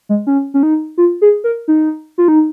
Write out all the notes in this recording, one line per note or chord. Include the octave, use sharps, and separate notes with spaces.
G#3
C#4
C#4
D#4
F4
G#4
A#4
D#4
F4
D#4